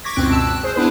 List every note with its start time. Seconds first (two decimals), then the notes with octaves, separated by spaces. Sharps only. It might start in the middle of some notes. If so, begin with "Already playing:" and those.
0.04 C#6 D6 G#6 A#6 B6
0.16 C#2 F#2 B2 C4 F#6 D7
0.31 A5 E6
0.45 F#6
0.63 G#4 C5
0.76 B3 D4 E4 G#4 B4